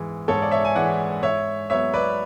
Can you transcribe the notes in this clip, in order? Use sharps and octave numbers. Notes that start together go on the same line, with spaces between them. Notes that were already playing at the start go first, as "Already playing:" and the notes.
Already playing: G#2 E3 G#3
G#2 A4 C#5
D5
C#5 E5
G#5
E3 G#3 D5 F#5
G#2 C#5 E5
F#3 B3 C#5 E5
B4 D5